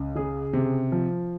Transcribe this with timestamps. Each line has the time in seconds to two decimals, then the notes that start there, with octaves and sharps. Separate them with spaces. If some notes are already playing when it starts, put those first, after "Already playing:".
Already playing: C#2
0.15 C#3 G#4
0.53 C3
0.92 F3